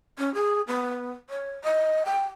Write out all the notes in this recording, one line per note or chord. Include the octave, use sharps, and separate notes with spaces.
C#4
G#4
B3
C#5
D#5
G5